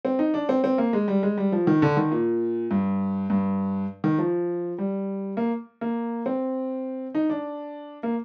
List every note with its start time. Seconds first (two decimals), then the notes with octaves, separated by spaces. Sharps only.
0.05 C4
0.19 D#4
0.34 D4
0.49 C4
0.64 C4
0.78 A#3
0.93 G#3
1.08 G3
1.23 G#3
1.38 G3
1.52 F3
1.67 D#3
1.82 D3
1.97 D#3
2.12 A#2
2.71 G2
3.30 G2
4.04 D#3
4.18 F3
4.78 G3
5.37 A#3
5.81 A#3
6.26 C4
7.15 D#4
7.30 D4
8.03 A#3